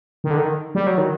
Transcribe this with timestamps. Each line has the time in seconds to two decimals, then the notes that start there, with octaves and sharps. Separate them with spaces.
0.24 D#3
0.31 D3
0.37 D#3
0.75 G3
0.87 F#3
0.98 D#3